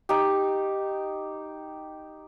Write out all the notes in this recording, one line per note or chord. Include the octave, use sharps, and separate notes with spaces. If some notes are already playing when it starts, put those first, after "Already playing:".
D#4 G4